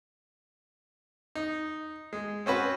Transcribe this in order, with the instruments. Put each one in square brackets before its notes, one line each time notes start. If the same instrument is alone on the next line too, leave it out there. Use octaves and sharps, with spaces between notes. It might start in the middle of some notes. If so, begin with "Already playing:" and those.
[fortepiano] D#4
G#3
C4 C#4 F#4 B4